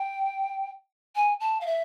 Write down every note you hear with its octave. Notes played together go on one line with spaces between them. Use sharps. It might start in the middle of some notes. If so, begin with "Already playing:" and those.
Already playing: G5
G#5
A5
F5
E5